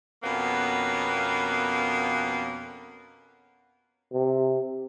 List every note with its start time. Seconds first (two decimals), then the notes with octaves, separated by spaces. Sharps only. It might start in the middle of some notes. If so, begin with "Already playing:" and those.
0.24 F2 B2 A#3 B3 C#4
4.13 C3